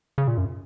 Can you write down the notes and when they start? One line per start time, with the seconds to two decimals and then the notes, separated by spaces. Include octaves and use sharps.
0.18 C#3
0.28 A#2
0.38 F#2